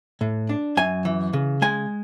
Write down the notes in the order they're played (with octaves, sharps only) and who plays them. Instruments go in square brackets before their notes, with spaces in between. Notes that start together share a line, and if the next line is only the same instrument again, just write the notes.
[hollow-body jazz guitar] A2
D4
F#2 G#5
E3
C#3
G#3 G#5